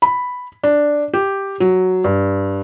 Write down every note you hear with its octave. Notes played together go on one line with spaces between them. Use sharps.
B5
D4
G4
F#3
G2